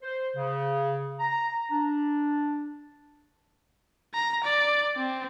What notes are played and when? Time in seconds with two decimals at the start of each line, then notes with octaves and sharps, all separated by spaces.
0.02 C5
0.36 C#3
1.19 A#5
1.72 D4
4.14 A#5
4.44 D5
4.97 C4